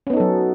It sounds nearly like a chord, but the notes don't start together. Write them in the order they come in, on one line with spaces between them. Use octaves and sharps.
C#4 B3 D#4 A4 F#3